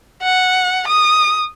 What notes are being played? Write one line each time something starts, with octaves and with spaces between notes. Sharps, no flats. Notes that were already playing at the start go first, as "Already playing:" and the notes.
F#5
D#6